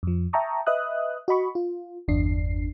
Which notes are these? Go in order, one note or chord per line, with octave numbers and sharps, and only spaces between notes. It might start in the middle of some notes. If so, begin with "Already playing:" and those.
F2 F3
E5 G5 A5 A#5 C#6 D#6
B4 D#5 E5 D#6 F#6
F#4 D#5 B5 C#6
F4
G1 E2 D4 C7